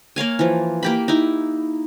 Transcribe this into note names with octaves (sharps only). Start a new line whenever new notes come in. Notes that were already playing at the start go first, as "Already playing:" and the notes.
A#3 C#5 F5 G#5
E3 F3
A#3 G4 B5
D#4 E4